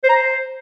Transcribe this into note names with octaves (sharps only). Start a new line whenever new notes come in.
C5
A#5
C5